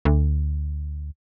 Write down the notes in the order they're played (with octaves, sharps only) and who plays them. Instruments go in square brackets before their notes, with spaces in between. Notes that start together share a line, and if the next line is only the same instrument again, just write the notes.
[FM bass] D2